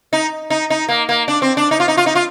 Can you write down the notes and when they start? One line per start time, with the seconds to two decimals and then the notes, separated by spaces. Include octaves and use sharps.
0.13 D#4
0.50 D#4
0.70 D#4
0.89 A#3
1.09 A#3
1.28 D4
1.42 C4
1.57 D4
1.71 D#4
1.80 F4
1.88 D#4
1.97 F4
2.06 D#4
2.15 F4